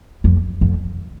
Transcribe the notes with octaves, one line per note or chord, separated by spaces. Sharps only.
F2
F2